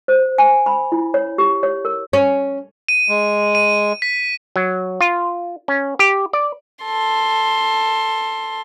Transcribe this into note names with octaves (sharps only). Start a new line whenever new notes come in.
C5
G#5
B5
E4
C#5
G4
C#5
A#4
C#4
D#7
G#3
D#7
B6
F#3
F4
C#4
G4
D5
A4 C6